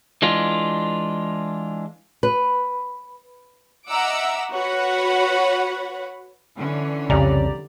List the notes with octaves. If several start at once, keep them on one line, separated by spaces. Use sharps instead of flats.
E3 G#3 D4 F4
B4
D#5 E5 F#5 A#5 D6 E6
F#4 B4 C#5 F#5 B5
D3 E3 C#4
C2 F2 C#3 G4 D5 A#5